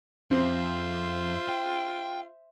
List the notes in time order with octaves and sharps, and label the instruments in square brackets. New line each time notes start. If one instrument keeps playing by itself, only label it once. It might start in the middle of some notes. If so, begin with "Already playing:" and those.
[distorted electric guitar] F2 [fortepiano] C4 [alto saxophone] F4 [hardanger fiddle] C5 E5
[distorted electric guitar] G5